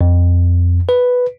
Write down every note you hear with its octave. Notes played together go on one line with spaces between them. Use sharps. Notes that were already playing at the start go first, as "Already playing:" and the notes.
F2
B4